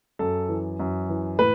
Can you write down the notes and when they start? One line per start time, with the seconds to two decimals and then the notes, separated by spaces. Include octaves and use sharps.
0.19 F#2 A4
0.49 E3
0.80 F#2
1.09 E3
1.39 A2 B4